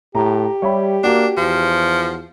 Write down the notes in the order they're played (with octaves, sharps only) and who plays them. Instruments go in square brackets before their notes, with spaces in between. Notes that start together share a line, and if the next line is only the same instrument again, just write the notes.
[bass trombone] A2 [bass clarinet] G4 [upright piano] A#5
[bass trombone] G3 [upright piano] C#5 E5 B5
[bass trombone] A#3 [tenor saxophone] D4 [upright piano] F#4
[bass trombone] E2 [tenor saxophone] F3